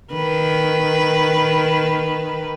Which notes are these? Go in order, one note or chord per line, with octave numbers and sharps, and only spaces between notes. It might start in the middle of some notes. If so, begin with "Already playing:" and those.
D#3 B4